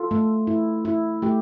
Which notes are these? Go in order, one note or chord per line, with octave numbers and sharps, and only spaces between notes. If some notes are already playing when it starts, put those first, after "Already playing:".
Already playing: F4 A4
A3
E4
E4
A3 G4